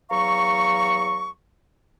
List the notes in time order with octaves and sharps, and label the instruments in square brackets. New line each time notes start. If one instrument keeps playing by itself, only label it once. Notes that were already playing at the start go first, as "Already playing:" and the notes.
[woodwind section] E2 F#3 F5 A#5 C#6